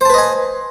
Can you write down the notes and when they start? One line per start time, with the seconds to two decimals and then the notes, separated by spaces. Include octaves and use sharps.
0.01 C5
0.05 A5
0.10 B4
0.14 D#5
0.18 G#5